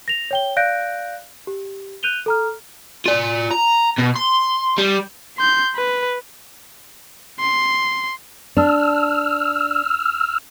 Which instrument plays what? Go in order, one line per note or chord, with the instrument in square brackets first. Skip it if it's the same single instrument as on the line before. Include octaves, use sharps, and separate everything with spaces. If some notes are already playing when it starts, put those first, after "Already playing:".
[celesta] A#6 F7
C#5 G5 G7
D5 F5 F#6 G6 A#6 D7
G4
F#6 G6 D#7 F7 G7
A4 A#5 F6
[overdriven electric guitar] F4 D5
A#5
B2
C6
G3
[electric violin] C6 G6
B4
C6
[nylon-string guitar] D4 [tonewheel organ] E6 F6